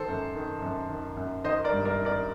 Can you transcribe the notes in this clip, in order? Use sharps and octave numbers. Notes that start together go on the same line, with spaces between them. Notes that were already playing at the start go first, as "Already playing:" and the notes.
Already playing: D#3 A4 C5
F#2
D#3
F#2
D#3
F#2
D#3 C5 D#5
A#4 D5
G2
A#4 D5
D#3
A#4 D5